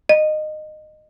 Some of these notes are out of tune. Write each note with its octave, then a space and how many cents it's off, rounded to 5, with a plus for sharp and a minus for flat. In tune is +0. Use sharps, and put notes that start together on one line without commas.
D#5 -20